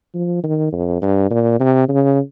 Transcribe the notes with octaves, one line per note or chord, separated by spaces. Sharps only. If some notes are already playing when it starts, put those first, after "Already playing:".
F3
D#3
F2
G2
A#2
C3
C#3